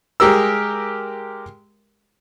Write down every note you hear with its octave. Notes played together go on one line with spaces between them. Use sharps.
G#3 G4 A#4 E6